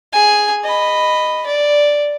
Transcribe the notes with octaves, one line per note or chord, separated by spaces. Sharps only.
G#4 G#5
D#5 B5
D5